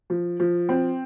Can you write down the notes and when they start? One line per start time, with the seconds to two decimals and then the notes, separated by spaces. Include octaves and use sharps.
0.10 F3
0.40 F3
0.69 C4